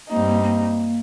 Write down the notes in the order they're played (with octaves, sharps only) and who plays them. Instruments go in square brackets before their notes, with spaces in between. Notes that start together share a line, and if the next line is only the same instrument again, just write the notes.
[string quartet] G2 G3 C4 D#4 [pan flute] A#3
[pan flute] A#3
A#3